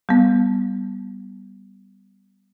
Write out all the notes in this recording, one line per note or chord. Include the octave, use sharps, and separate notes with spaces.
G3 B3